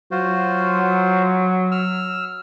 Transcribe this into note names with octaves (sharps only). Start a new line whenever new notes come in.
F#3 F4 F#4 C5
E6 F6